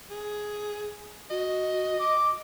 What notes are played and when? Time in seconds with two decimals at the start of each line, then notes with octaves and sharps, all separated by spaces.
0.10 G#4
1.30 F#4 D#5
1.98 D6